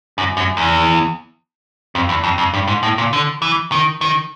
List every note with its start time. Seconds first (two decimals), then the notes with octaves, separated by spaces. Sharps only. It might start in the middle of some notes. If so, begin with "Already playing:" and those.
0.18 F#2
0.37 F#2
0.57 E2
1.95 F2
2.09 E2
2.24 F2
2.38 F2
2.54 G2
2.67 G#2
2.83 A2
2.98 A#2
3.13 D3
3.42 E3
3.72 D#3
4.01 D#3